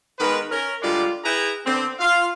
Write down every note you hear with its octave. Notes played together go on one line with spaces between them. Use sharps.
D#3 G#3 B3 A#4 B4
C#4 A#4
D3 G3 G#3 F4 D5
E4 G#4 B4 G5 A#5
D3 B3 C4
F4 F5